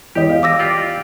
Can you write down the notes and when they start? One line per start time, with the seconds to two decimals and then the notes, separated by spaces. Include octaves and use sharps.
0.15 E2 G4 D#5
0.29 F5
0.43 D6 E6 A#6
0.59 F4 G4 D5